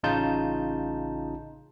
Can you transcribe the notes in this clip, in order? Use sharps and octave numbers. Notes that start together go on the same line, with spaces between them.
A1 C#3 D#4 F4 A5 G6